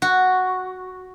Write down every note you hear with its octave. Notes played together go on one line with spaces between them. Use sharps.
F#4